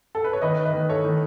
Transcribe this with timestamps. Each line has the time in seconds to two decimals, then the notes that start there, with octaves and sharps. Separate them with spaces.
0.15 A4
0.24 B4
0.33 C#5
0.42 D#3 B4 D#5
0.65 B4 D#5
0.73 D#3
0.90 A4 C#5
1.05 D#3